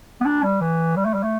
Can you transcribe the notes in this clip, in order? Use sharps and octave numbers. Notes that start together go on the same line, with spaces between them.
B3
D4
G3
E3
G3
A3
G3
A3